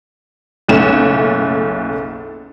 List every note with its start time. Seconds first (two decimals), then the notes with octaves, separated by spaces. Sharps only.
0.68 F#1 B1 A3 C#4 E7